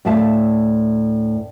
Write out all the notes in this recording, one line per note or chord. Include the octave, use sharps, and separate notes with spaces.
D2 A2 E5 F5 A5